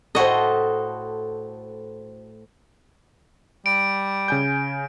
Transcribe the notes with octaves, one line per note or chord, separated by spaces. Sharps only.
A2 F#4 A4 C5 D#5
G3 D7
C#3 G#5 G6